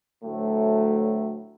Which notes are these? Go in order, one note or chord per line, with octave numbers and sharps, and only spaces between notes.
D2 A2 F#3 A3